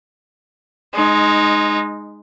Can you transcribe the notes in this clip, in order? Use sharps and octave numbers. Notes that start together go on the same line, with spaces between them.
G#3 D#4